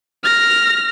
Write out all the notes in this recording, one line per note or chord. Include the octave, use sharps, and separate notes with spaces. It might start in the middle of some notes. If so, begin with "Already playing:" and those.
F6 A#6